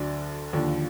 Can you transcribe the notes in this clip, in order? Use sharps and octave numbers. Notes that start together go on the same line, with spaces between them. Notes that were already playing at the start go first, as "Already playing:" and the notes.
Already playing: D2 D3 F#3 D4
D#2 D3 F3